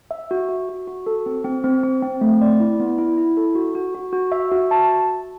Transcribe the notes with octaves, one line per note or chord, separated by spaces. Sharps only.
E5
F#4
F#4
F#4
F#4
A4
C4
C4
C4
C4
C4
A3
D5
E4
B3
E4
E4
A4
F#4
F#4
F#4
F#4
E5
F#4
A5